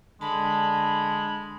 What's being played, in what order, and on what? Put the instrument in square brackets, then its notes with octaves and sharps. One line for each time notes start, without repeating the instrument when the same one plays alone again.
[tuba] D3 [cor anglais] G#3 [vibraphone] A5 [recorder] B5